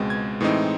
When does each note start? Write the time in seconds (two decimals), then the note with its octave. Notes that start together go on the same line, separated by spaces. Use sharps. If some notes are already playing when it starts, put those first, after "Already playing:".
Already playing: C#2 B2 G#3 C4
0.10 G#6
0.41 A2 E3 G#3 C4 D#4